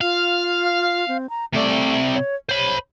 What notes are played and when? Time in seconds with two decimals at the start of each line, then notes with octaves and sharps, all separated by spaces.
0.01 F4 F5
1.08 C4
1.29 A#5
1.53 C3 A3 D5
2.14 C#5
2.49 C5 C#5 B5